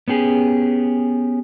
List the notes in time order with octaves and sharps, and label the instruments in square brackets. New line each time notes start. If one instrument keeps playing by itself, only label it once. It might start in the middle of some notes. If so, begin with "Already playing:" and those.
[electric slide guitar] B3 C#4 G4 G#4